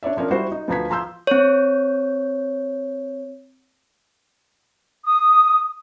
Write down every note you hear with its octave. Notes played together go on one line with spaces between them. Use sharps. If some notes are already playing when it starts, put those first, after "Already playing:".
D4 C#5 D5 E5
F3 C#4 D4 A#4
G3 E4 F#4 C5
D#4
D2 F3 B4 A#5 G#6 B6
F3 A#5 C6 E6 G6
C4 C#5
D#6